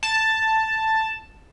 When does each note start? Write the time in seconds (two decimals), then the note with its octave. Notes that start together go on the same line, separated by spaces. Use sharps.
0.03 A5